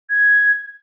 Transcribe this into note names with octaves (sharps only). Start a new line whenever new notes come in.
G#6